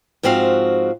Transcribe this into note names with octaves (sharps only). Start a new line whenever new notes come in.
G#2 F3 C4 F#4 A4 F5